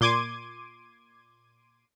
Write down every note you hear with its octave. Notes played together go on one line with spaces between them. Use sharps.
A#2 C6 D6 G#6 D#7